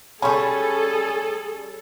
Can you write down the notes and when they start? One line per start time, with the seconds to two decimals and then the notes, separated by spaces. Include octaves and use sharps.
0.22 G3 C#4 G#4 A4 G#5 B5 C#6